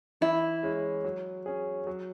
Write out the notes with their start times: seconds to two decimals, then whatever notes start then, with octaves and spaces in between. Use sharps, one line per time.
0.21 E3 E4
0.63 G#3 C#4
1.04 F#3
1.46 C#4 G#4
1.87 F#3